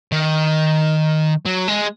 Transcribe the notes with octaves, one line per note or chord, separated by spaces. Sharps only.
D#3
F#3
G#3